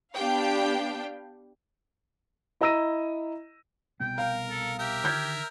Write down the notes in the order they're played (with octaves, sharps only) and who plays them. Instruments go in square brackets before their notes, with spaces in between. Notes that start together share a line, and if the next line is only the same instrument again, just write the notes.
[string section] B3 D4 G4 F5 G5
[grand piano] E4 D#5 A#5 E6 A#6 D#7
[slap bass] C2 B2 B3 [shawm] G5
[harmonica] A#4 [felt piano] F5
[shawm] A4
[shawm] G4 [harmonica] A#4 E5
[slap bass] D3 D#3 [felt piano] F6 G6 G#6